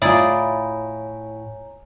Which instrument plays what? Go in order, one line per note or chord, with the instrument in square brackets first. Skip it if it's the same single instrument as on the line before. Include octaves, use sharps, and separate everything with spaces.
[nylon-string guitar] A2 F4 [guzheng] E4 G#4 D5 [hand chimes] C#5 G#5 A#5